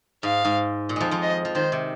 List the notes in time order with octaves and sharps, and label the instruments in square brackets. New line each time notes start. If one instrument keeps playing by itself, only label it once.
[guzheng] G#2 [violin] F5
[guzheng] G#2
A#2
F2 F3 G#3
F2 F3
[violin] D#5
[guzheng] F3
[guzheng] D#3 [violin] C5
[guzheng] C3